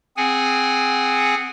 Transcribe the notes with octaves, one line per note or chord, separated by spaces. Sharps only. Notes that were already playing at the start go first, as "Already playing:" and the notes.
C4 G#4 F#5 G#5